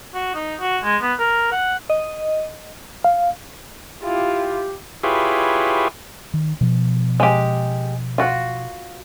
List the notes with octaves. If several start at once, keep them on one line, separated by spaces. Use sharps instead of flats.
F#4
D#4
F#4
G#3
B3
A#4
F#5
D#5
F5
E4 F4 G4
E4 F4 G4 G#4 B4 C#5
D#3
B2 F3
G#3 G4
F4 F#4